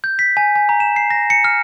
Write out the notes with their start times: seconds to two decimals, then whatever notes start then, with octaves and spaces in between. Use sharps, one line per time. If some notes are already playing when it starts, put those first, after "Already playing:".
0.04 G6
0.19 B6
0.37 G#5
0.56 G#5
0.69 A#5
0.80 E7
0.96 C7
1.10 A#6
1.30 C#7
1.44 F6